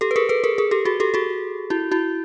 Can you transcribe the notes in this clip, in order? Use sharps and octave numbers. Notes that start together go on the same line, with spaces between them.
G4 A4
B4
G#4 A#4
A4 B4
G#4 A#4
G#4 A#4
G4 A4
F#4 G#4
G4 A4
F#4 G#4
E4 F#4
E4 F#4